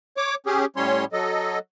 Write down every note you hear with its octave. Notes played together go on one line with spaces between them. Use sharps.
C#5 D6
C#4 G4 G#4
A2 G3 C#4 C#5 C6
F#3 A4 D#5